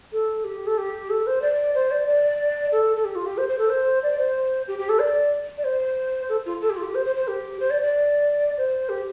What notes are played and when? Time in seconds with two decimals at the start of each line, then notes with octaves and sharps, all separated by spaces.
0.12 A4
0.44 G4
0.67 A4
0.78 G4
1.10 A4
1.27 C5
1.42 D5
1.75 C5
1.91 D5
2.08 D5
2.72 A4
2.96 A4
3.05 G4
3.15 F4
3.26 G4
3.38 C5
3.49 C5
3.59 A4
3.70 C5
4.03 D5
4.18 C5
4.68 G4
4.78 G4
4.89 A4
5.00 D5
5.58 D5
5.64 C5
6.29 A4
6.46 F4
6.62 A4
6.70 G4
6.77 F4
6.83 G4
6.95 C5
7.06 C5
7.16 C5
7.28 G4
7.60 C5
7.70 D5
7.82 D5
8.57 C5
8.89 G4